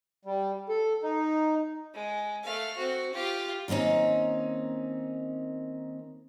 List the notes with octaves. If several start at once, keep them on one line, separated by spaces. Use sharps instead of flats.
G3
A4
D#4
G#3
A3 F5
C4 F#4
F4 G4
D#3 A#3 C4 C#4 D#4